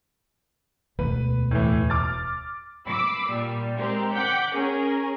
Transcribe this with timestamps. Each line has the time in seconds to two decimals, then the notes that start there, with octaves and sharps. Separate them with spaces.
0.99 E1 D2 B4
1.51 A2 E3
1.90 D6 F6 A6
2.88 B5 D6 E6 C7
3.30 A#2 G3
3.79 G#3 C4 G4 A#4
4.15 F#5 G5 D6 G6 B6
4.51 C#4 G#4 A#4